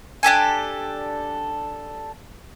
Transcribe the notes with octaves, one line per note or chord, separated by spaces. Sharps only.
D4 G4 A4 G#5